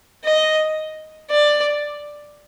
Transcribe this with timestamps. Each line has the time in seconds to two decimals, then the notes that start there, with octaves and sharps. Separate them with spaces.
0.24 D#5
1.30 D5